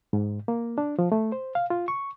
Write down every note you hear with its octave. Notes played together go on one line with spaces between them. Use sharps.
G#2
A#3
D4
F3
A3
C5
F5
F4
C#6